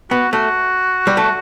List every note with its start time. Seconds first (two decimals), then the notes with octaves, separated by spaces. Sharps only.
0.11 B3 F#4
0.33 A3 F#4
1.07 G3
1.17 A3